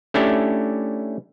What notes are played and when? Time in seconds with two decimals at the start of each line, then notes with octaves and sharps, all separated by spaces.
0.14 A3 C#4 D4 E4 G4